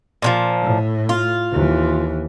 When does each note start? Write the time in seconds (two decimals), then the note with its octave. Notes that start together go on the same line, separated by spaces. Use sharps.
0.22 A#2 D3 F3
0.62 A2
1.09 F4
1.52 D#2 E3